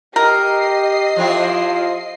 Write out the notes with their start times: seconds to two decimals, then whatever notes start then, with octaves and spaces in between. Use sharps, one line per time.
0.16 G4 A#4 D#5 C7
1.16 F3 E4 F4 G4